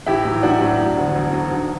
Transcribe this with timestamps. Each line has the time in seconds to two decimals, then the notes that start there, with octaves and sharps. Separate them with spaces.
0.07 A1 E4 G4
0.25 A2 F#3
0.43 A1 D4 F#4
0.61 A2 F#3
0.79 E1
0.97 D2 D3 F#3
1.15 E1
1.33 D2 D3 F#3
1.51 B1